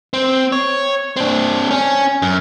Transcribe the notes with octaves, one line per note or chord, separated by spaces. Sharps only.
C4
C#5
C4 D4
C#4
F#2